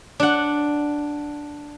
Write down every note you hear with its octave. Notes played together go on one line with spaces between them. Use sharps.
D4 F#5